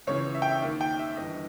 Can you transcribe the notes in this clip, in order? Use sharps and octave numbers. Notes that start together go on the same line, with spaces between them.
C#2 C#3 E3 C#5
E5
G5
E5
D#2 D#3
G5
E5
G1 G2 E3 D#5